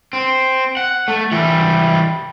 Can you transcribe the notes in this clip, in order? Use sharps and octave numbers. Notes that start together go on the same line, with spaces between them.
C4
F#5
A3
E3 G3